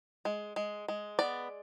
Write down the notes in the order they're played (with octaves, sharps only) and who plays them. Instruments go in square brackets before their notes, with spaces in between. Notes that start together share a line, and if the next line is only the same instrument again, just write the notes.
[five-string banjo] G#3
G#3
G#3
B3 D5